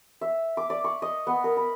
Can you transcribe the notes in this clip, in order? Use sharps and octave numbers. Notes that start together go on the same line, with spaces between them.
E5
D6
D5
C#6
D#5
B3
A#4
B5